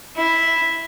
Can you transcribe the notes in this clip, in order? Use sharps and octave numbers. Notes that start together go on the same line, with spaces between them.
E4